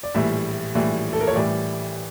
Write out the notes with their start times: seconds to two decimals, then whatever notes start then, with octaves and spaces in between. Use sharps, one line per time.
0.03 D5
0.14 A#1 A2 E3 G3 E5
0.75 A#1 A2 E3 G3
1.13 A4
1.21 A#4
1.28 C#5
1.35 A1 A2 E3 G3 D5